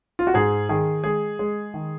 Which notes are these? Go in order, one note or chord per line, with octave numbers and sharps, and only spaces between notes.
F4
F#4
G#2 G#4
D#3 G#4
G#3 G#4
G#3
D#3